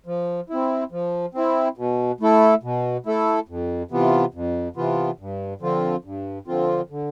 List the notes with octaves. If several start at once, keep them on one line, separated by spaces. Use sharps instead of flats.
F3
C4 E4
F3
C4 E4
B2
A3 E4 A4
B2
A3 E4 A4
F2
C3 E3 B3 F4
F2
C3 E3 B3 F4
G2
D3 F3 C4 F4
G2
D3 F3 C4 F4
D3